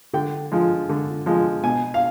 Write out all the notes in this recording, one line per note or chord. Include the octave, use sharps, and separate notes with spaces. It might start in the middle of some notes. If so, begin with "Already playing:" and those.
D3 G5
F3 G#3
D3
F3 G#3
B2 G#5
F5